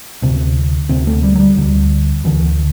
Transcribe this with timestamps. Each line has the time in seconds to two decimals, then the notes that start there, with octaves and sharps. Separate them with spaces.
0.22 D2 C3
0.89 D2 C3 C4
1.07 A3
1.23 G3
1.35 F#3
1.40 G3
1.56 D2 D3
2.24 D2 D3 E3